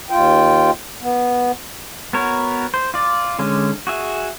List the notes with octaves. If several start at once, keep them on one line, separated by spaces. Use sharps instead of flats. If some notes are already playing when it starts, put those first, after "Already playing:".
D#2 F4 G5
B3
B3 F#4 A#4 C#5
C5
F4 D5
D3 G#3 C#4 D4
F#4 G#4 E5